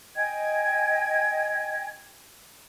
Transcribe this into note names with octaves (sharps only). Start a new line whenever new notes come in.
D#5 G5 G#5 G#6